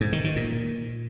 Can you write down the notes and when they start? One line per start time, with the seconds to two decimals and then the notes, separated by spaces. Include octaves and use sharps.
0.01 G#2
0.13 D#3
0.24 D#3
0.36 A#2